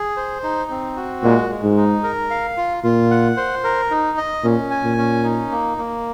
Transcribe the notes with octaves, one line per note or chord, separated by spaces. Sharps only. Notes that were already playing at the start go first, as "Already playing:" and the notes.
Already playing: G#4
C5
D#4
C4
F#4
A#2 G#3
G#3
G#2
D#4
A#4
F5
F4
A#2 F4
F#5
C5
A#4
D#4
D#5
A#2 C#4
G#5
A#2
C#4
D#4
A#3
A#3